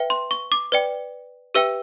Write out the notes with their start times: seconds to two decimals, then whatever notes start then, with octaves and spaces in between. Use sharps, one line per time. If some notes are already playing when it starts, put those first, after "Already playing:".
Already playing: B4 E5 G5
0.10 C6
0.31 C#6
0.52 D6
0.72 B4 D5 G5
1.55 G4 B4 E5 G5 E6